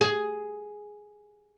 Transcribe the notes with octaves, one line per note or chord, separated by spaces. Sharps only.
G#4